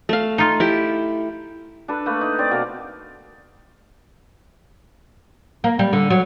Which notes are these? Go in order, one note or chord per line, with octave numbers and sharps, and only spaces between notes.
A3 F5
D#4 F4
E4 G4
D4 A4 B4
A3 A#3 B4
D#4
C4 D5
B2 A#3 A#4
A#3
G3
D3
F#3